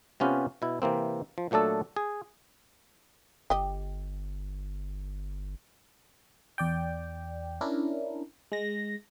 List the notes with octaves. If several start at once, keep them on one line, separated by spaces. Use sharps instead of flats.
C3 B3 C#4 F4 G4 B4
B2 E4
C3 E3 A#3 C4
F3
A#2 F#3 A3 D4 A4
G#4
G1 G4 D#5
E2 D5 G5
C#4 D4 E4 A#4
G#3 A#6